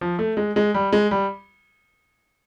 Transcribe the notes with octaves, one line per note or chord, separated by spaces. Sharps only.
F3
A3
G#3
G#3
G3
G#3
G3